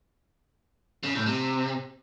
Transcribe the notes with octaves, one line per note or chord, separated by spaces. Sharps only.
C#3
A2
C3